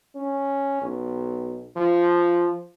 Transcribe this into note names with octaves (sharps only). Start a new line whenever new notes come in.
C#4
B1
F3